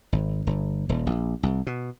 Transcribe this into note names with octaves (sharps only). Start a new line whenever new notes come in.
G#1
G1
D#1
A#1
C2
B2